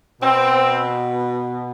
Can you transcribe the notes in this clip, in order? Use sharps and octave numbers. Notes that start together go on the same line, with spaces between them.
B2 C4